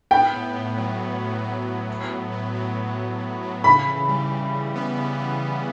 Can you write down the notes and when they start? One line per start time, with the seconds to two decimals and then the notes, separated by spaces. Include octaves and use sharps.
0.11 B3 G5
0.34 A2
0.55 A2
0.78 F#3
0.99 A2
1.22 A2
1.44 B3
1.66 A2
1.88 A2
2.10 A2
2.32 B3
2.55 F#3
2.77 A2
2.99 A2
3.20 F#3
3.43 F#3
3.64 C#3 B5
3.87 E3
4.09 G3
4.31 C#3
4.53 C#3
4.75 B3
4.98 C#3
5.20 E3
5.41 E3